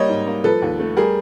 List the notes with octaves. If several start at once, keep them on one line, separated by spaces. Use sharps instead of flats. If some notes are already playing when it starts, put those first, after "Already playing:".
Already playing: G3 A#3 C#5 D#5
G#2
A#3
F3 A4 B4
D#2
A3
G3 G#4 A#4